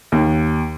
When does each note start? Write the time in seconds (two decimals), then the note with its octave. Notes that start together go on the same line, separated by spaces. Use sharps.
0.12 D#2